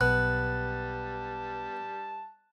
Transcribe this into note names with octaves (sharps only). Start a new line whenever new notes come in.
B1 G3 B3 A5 F#6